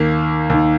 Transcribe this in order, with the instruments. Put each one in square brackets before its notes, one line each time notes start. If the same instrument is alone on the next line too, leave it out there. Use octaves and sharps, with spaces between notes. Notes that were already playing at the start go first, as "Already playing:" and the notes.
Already playing: [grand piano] D#2 D#3 A#3
D#2 D#3